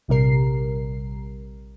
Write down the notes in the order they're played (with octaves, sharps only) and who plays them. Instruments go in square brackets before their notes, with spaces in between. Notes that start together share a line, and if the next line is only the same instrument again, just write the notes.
[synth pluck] A#1 C3 G3 A#4 C7